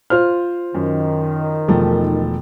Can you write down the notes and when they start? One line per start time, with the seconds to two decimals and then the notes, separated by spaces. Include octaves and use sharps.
0.10 F4 C5 F6
0.74 F#2 D#3
1.68 E1 F3 A3